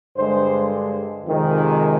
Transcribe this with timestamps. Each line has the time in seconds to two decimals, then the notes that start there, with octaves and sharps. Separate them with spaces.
0.16 G2 D3 G#3 C5
1.25 F2 C3 D#3 G#3